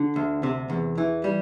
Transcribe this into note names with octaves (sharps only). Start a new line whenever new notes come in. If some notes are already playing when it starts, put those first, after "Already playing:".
Already playing: D3
D2
C3
E2
E3
G3